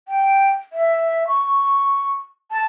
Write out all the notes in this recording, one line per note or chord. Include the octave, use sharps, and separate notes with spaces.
G5
E5
C#6
A5